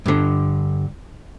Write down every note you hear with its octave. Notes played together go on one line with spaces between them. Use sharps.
G2 D3